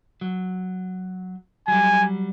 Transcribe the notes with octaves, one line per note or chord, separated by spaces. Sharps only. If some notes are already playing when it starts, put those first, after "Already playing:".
F#3
F#3 G3 G#5